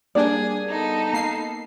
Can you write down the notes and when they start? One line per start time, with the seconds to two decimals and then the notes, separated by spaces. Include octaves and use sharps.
0.15 G3 A#3 D4 G#4 D5
0.67 B3 D#4 A4
1.13 A#3 C7